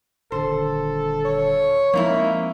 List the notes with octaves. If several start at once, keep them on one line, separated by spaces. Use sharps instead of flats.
D#1 D#2 D3 A4 C5
C#5
F2 F3 G#3 A#3 C4 D#4 E4